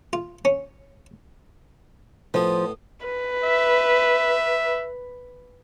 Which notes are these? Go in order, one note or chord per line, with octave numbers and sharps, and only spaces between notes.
F4
C#4
A2 F3 B3
B4
E5